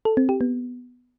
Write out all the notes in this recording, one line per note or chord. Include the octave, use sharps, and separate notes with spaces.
A4
C4
G4
B3